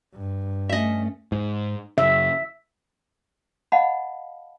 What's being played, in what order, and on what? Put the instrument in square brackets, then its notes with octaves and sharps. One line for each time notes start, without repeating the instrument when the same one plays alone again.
[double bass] G2
[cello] A3 [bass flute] C#4 [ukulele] D#5 E5
[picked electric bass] G#2
[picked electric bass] F#2 C#3 [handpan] E5
[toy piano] D#5 F5 F#5 A5 B5